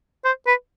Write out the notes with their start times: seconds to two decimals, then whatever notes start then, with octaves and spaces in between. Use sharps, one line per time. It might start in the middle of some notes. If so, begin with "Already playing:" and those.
0.25 C5
0.47 B4